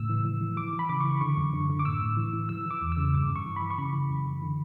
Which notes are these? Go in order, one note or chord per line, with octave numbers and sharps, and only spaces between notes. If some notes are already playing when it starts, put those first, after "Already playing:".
Already playing: A2 C#3 E6
E3
E3
E3
E3 D6
E3
B5
C#3 D6
E3 C#6
D3 C#6
F#2
D3
D3
D6
A2 E6
A2
E3
E3
E3 E6
E3
D6
E2
E6
C#3
G2 D6
G2
C#6
E3
B5
E3
C#6
C#3 B5
E3
F#2
E3
D3